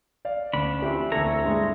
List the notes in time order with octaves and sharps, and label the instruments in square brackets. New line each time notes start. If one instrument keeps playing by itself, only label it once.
[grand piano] D5 F5
[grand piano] D2 [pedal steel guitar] C#4 D4 B5
[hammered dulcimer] E3 F3 C4 [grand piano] G4
[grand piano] D2 A4 [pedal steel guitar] C#5 A#5 [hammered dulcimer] E5
[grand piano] G2 G#3